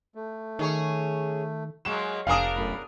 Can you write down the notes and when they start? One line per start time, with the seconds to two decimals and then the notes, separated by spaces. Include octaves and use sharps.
0.15 A3
0.59 D#3 C#4 G#4 C#5
1.85 F#3 G#3 A#3 E7
2.27 F1 B2 D4 A#4 F5 G#5 D#6
2.56 F#2 A2 B5